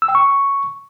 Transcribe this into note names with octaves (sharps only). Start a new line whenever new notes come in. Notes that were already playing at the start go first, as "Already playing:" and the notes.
E6
G5
C#6